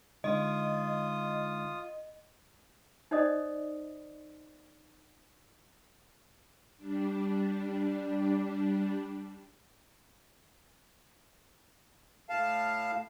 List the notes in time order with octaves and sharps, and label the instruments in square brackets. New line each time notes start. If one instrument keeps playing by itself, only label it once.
[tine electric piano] D3 G#3 D#4 [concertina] F4 D#6 [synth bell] D#5
[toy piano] D#4 C5 D5 D#5 D#6
[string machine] G3 D4
[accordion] A2 F5 A5